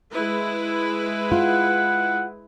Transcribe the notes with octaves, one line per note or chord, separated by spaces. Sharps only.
G#3 E4 B4
F4 F#5